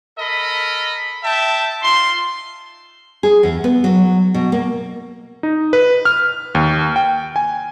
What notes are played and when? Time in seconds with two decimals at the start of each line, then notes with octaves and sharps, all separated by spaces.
0.18 A4 A#4 D#5 B5
1.24 E5 G5 A5
1.83 D#4 F4 C6
3.23 G#4
3.43 E2
3.64 B3
3.84 F#3
4.34 B2
4.52 A#3
5.43 D#4
5.73 B4
6.05 F6
6.55 D#2
6.96 G5
7.36 G#5